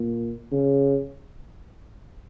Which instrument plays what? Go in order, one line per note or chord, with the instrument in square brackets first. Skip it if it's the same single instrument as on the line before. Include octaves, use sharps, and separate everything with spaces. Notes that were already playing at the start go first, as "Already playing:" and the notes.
Already playing: [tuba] A#2
C#3